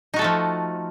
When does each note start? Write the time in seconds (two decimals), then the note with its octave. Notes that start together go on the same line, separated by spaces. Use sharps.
0.14 D#4
0.16 F#4
0.19 A4
0.22 A3
0.24 F3